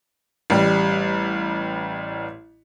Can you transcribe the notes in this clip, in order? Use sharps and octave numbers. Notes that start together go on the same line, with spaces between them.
A1 G3